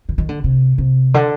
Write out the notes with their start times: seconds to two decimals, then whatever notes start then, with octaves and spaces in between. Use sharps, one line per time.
0.09 D3
0.18 D#3
0.29 D3
0.44 C3
0.78 C3
1.14 D3